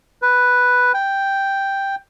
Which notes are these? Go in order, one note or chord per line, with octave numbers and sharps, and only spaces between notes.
B4
G5